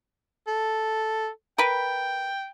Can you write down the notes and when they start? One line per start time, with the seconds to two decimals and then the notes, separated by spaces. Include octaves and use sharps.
0.47 A4
1.58 A#4 B4 G5